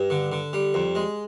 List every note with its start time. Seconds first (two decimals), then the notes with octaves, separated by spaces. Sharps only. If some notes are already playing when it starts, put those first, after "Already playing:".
Already playing: G2
0.10 D3
0.32 D3
0.53 G3
0.74 F2
0.95 G#3